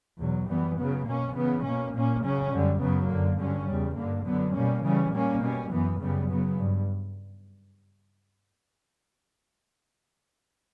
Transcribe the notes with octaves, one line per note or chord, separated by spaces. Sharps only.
E2 B2 F#3
F#2 E3 G3 B3
C#3 F#3 B3
B2 A#3 C#4
C#3 E3 B3
B2 A#3 C#4
A#2 A#3 C#4
C#3 F#3 C#4
F#2 D3 G3
F#2 C#3 F#3 B3
F#2 D3 A#3
G2 D3 F#3 C#4
E2 C#3 G3
G2 D3 A#3
F#2 D3 F#3 B3
B2 G3 A#3 C#4
C#3 E3 G3 C#4
A#2 G3 A#3 C#4
B2 G3 C#4
F#2 E3 B3
F#2 C#3 G3 B3
C#3 F#3 B3
G2